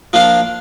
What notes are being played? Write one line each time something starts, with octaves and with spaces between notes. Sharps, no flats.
F3 A#3 D4 F4